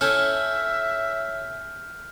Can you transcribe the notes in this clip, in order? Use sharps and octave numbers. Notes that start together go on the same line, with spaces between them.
C#4 E4 A4 E5 F6 G6